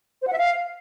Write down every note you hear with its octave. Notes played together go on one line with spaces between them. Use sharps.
C5
F#5
E5
F5